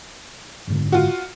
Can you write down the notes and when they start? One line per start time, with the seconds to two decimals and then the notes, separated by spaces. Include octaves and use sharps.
0.67 F#1 G#2 D3
0.92 F4 F#4